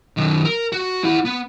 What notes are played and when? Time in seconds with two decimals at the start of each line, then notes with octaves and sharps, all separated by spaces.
0.17 F#2 D#3
0.45 A#4
0.72 F#4
1.04 E4 F#5
1.25 B3